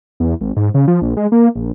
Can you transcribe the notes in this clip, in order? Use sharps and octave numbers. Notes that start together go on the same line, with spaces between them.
E2
G#1
G#2
C#3
F3
A#1
G#3
A#3
A#1